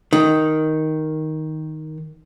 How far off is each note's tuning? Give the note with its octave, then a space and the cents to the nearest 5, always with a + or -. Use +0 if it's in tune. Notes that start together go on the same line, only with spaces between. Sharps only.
D#3 +5